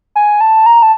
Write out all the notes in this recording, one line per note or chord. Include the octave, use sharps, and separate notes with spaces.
G#5
A5
A#5
A5